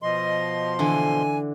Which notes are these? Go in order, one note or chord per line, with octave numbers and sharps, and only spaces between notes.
B2 F3 D#5 C6
D3 E3 G#5